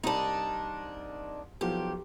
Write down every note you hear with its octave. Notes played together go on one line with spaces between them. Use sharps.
C2 G3 D4 D#4 B5
B1 F3 F#3 G4